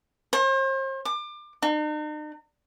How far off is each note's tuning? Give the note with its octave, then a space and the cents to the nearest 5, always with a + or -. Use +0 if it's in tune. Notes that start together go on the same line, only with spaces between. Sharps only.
C5 +40
D6 +30
D#4 -45